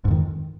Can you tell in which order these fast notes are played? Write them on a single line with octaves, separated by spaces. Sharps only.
G#2 F2 D#3